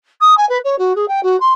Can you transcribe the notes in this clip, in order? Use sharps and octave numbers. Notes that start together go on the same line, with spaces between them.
D#6
G#5
B4
C#5
F#4
G#4
G5
F#4
C6